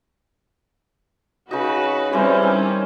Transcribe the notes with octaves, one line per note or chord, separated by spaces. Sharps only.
C#3 D#4 F#4 B4
E3 G3 C4 C#4 A#4 C5
D#3